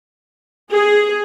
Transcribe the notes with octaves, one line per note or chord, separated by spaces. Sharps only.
G#4